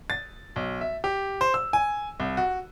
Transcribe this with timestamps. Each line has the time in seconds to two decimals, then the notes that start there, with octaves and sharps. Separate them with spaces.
0.10 A6
0.56 B1
0.81 E5
1.04 G4
1.41 C5
1.54 E6
1.73 G#5
2.20 C2
2.37 F#4